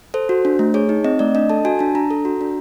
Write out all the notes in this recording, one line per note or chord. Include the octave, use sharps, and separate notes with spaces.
A4 C5
F#4
D4
A3
G#4 C#5
D#4
C4 D#5
A3 D5
D4 D#5
A4 A5
F#4 G#5
D4 A5
D4 A#5
A4
F#4
D4